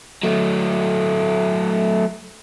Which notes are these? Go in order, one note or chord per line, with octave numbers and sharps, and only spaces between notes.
F#3 A3